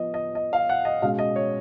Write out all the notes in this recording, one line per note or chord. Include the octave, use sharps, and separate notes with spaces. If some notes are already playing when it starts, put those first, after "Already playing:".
Already playing: F3 B3 D#5
D#5
D#5
F5
F#5
D#5
B2 G#3 C#4 F5
D#5
C#5